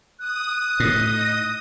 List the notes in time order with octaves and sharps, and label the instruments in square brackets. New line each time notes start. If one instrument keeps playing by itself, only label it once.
[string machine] D#6 [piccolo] F#6
[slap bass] A2 [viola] D#4 D#5